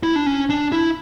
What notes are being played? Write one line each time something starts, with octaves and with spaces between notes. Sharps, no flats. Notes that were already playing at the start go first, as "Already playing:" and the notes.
E4
D4
C#4
D4
E4